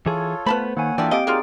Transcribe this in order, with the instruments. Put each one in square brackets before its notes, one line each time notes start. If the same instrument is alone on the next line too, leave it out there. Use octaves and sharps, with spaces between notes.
[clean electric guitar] E3 G#4 [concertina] F4 A4 C#5
[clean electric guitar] A3 B3 [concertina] F4 [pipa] B4 A5 B5 [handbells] C5
[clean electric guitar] D#3 [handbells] A#3 G#5 [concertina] C#5 F#5
[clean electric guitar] E3 D4 [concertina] F4 A4 E5 [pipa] F#4 D5 [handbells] G5
[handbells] C4 G4 D7 [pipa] D#5 [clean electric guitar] F5
[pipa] F#3 A#3 F4 [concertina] D#4 D5 [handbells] G#4 C6